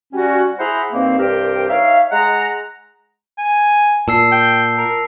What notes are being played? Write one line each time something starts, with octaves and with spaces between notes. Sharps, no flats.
G3 C#4 F#4
E4 G#4 C5 F#5 A#5 B5
G2 D#3 A#3 C4
C2 G2 G4 A#4 C5 G5
D#4 C#5 E5 F5
G#3 F#5 A#5
G#5
A#2 A5 E6 C7
G5
A#4